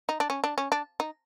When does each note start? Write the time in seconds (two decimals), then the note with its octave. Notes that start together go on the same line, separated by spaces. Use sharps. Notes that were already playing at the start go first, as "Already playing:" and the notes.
0.09 D#4
0.20 D4
0.30 C#4
0.44 D4
0.58 C#4
0.72 D4
1.00 D#4